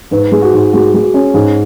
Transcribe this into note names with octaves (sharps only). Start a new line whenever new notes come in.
G#2 B4
G#3
F#4
G#2
G#3 F#4
G#3
F#4
C#4
G#2 G#4